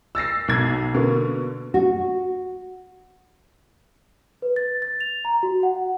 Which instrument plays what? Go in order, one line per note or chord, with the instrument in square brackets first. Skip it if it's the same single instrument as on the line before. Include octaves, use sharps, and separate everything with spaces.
[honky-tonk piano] E6 A6 A#6 C7
B1 G#6
B2 D3 A#3
[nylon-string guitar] F#4
[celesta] B4
A6
A6
F7
A#5
F#4
F#5